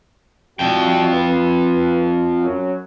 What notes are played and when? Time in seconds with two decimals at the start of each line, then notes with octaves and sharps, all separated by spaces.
0.59 F2 G3 E4 F#4 G5
1.13 B4
2.42 F#2 F#3